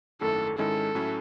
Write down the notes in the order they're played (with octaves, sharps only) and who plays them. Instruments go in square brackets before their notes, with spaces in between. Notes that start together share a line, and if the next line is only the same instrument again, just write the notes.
[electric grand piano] G#1 F#2 D#3 A3 E4 [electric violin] A4
[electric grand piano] G#2 D#3 G#3 C#4 E4 [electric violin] A4
[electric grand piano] A2 F#3 C#4 E4